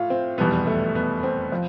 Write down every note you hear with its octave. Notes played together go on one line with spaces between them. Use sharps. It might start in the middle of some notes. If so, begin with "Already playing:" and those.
Already playing: A2 F4
C4
F1 E2 B2 G3 B3
A3
B3
C4
F3